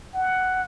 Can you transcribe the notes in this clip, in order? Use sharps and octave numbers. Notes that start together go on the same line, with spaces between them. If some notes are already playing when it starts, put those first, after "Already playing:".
F#5